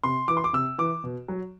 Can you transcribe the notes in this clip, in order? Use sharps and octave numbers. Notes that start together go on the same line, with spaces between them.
C3 C6
E3 D6
C6
D6
C3 E6
E3 D6
B2
F#3